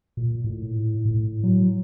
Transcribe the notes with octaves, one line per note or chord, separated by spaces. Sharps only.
A#2
A2
A2
F#3